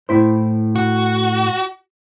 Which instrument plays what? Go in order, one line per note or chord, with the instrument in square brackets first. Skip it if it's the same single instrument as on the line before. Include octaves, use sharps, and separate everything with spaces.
[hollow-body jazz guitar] A2 E4 C5
[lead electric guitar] F#4